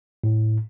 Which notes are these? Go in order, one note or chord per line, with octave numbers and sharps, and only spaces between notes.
A2